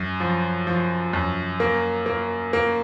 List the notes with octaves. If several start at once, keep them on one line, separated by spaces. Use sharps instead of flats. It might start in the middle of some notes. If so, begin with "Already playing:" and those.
Already playing: F#2
F3
F3
F#2
A#3
A#3
A#3